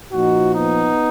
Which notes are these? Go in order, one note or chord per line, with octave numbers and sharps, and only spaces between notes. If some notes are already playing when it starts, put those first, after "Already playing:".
A#2 F3 D#4 F#4
B3 D#4